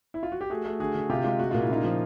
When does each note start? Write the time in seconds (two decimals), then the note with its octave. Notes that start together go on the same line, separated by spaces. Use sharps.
0.14 E4
0.23 F4
0.32 F#4
0.41 G4
0.50 A3 F#4 G#4
0.65 A3
0.80 D3 F#4 G#4
0.95 D3
1.09 C3 F4 G4
1.24 G#3 F4 G4
1.39 G#3 F#4
1.51 A#2 F4
1.62 E4
1.69 C#3 D#4 F4
1.84 F3